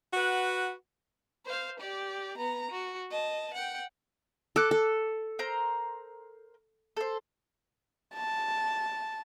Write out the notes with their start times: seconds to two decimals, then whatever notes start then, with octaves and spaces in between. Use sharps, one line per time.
0.14 F#4 B4 F#5
1.46 C5 F5
1.80 G4 D5
2.37 B3 A#5
2.71 F#4
3.10 D#5 A5
3.54 F#5 G5
4.56 A4 D6 F#6
4.71 A4
5.39 A#4 C5 A#5
6.97 A4 C5
8.14 A5